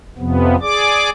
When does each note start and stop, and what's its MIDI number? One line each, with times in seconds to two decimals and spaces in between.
0.18 0.56 41
0.18 0.56 48
0.18 0.56 53
0.18 0.56 59
0.61 1.10 68
0.61 1.10 74
0.61 1.10 86